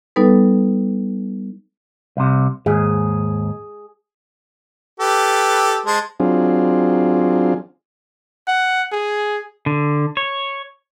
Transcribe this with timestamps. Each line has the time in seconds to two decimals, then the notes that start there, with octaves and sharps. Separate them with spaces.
0.16 G3 B3 D#4 A4 B4
2.17 C2 C3
2.66 D#2 G#2 G#4
5.00 G4 A4 B4
5.86 G#3 C5 A5
6.20 F#3 C4 D4 F4 G#4
8.48 F#5
8.92 G#4
9.66 D3
10.17 C#5